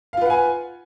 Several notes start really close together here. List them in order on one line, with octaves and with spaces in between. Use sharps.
F5 F4 B4 F#5 G#5